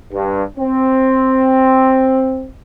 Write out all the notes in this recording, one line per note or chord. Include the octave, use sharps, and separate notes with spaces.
G2
C4